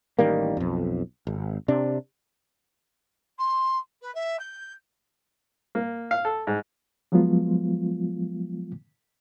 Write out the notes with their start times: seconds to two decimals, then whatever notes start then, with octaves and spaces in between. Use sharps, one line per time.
0.19 A1 D#3 G3 A#3
0.57 B1 F2
1.27 G#1
1.68 C3 D4
3.38 C6
4.01 B4
4.15 E5
4.39 G6
5.75 A#3
6.11 F5
6.25 A4
6.47 G#2
7.12 F3 F#3 G#3 B3 F4